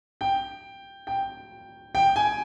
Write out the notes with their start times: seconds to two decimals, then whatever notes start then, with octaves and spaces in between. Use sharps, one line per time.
0.21 G5
1.07 G5
1.95 G5
2.16 G#5